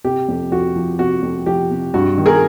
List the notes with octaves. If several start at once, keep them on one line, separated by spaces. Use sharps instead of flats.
C3 G4
F2
F2 F#4
F3
C3 F#4
F2
F3 G4
C3
G2 F#4
D#3
G#4 A#4